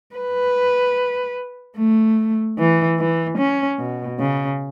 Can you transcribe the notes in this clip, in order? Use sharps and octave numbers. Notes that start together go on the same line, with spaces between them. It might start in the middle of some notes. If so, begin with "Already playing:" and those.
B4
A3
E3
E3
C#4
B2
C#3